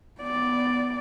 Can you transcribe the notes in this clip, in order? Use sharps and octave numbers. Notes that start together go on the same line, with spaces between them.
B3 D5